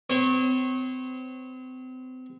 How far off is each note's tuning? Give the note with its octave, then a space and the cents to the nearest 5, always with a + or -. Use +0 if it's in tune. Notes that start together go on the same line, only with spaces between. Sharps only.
C4 -35 C#5 -30